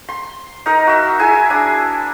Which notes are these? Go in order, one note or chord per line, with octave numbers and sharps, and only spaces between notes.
C6
D#4 A#4 D#5
F#4 E5
E4 G#4 G#5
D4 G#5